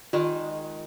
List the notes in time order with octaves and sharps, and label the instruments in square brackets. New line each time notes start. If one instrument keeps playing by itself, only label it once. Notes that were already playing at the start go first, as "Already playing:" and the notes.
[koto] D#3 G#3 [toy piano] F4